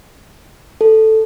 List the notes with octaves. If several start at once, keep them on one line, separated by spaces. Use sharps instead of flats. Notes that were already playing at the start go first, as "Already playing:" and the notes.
A4